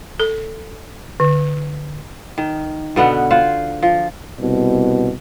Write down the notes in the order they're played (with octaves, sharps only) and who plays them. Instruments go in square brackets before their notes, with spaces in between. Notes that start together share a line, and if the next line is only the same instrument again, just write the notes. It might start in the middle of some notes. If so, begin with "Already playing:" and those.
[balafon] A4
D3
[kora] D#3
B2 D3 B3 F#5
F4 C5 F5 F#5
F3
[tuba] C2 [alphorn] B2